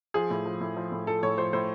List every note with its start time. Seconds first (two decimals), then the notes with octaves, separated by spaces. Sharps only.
0.14 F3 G#4
0.30 A2
0.46 F3
0.61 A2
0.77 F3
0.92 A2
1.07 F3 A4
1.23 A2 C#5
1.38 F3 C5
1.53 A2 C5